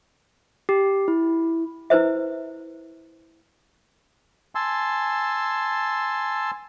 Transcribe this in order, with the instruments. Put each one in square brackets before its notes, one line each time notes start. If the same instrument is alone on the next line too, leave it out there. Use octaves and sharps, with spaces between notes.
[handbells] G4
E4
[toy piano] E4 B4 C5 E5
[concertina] G#5 A5 C6 E6